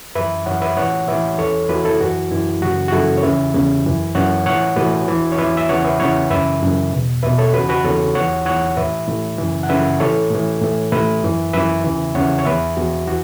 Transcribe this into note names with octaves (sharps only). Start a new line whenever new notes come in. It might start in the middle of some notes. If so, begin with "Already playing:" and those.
F#2 E3 B4 E5
F#2 E3 C#5 F#5
B4 E5
A2 E3 C#5 F#5
A2 E3 B4 E5
E2 E3 A4 C#5
E2 E3 F#4 B4
E4 A4
F#2 E3 F#4
F#2 E3 E4
F#2 C#3 E3 F#4
F#4
F#2 C#3 E3 E4 A4
C#5
E2 C#3 E3 B4 E5
E2 C#3 E3
F#2 E3
F#2 E3 C#5 F#5
A2 E3 C#5 F#5
A2 E3 F#4 B4
E2 E3
C#5
E2 E3 B4 E5
E5
E2 C#3 E3 C#5 F#5
B4 E5
E2 C#3 E3 C#5 F#5
F#2 C#3 E3 B4 E5
F#2 C#3 E3
E2 B2
E2 B2 B4 E5
A4 C#5
E2 C#3 E3 F#4 B4
F#4 B4
E2 C#3 E3 A4 C#5
E2 E3 C#5 F#5
E2 E3 C#5 F#5
A2 E3 B4 E5
A2 E3
F#2 C#3 E3
F#5
F#2 C#3 E3 B4 E5
A2 E3 A4 C#5
A2 E3
A2 E3
A2 E3 B4 E5
F#2 E3
F#2 E3 B4 E5
E2 C#3 E3
E2 C#3 E3 C#5 F#5
C#5
E2 E3 B4 E5
E2 E3 F#4
E3 F#4